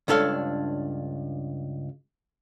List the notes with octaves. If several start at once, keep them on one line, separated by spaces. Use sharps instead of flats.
C#2 G2 D4 A4 C#5 F5